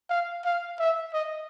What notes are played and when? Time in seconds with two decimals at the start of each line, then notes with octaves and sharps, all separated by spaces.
0.10 F5
0.45 F5
0.80 E5
1.14 D#5